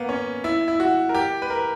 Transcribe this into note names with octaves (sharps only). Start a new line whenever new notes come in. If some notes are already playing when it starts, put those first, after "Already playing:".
Already playing: A#3 B3
C#4
E4
E4
F#4
A#4
G4
B4
A#4